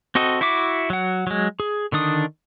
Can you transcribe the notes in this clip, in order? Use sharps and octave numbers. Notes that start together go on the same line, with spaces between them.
C4 F#4 A4 D#5
E4 F#4 E5 D6
F#3 F#5
F#3 G#3
G#4
D3 D#3 D4 D#6